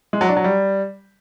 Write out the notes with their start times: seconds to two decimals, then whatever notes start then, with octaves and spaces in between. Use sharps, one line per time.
0.13 G#3
0.21 F#3
0.29 D4
0.37 F#3
0.44 G3